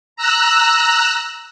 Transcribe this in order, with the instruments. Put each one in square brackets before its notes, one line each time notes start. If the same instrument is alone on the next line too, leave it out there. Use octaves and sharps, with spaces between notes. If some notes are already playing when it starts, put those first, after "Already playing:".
[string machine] A#5 E6 F#6